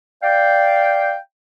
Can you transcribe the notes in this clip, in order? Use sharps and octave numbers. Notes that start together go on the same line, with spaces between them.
D5 F5 G5